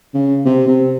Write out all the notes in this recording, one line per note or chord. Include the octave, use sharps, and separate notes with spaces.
C#3
C3
C3